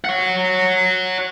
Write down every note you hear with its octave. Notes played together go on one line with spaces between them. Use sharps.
C#5 F#5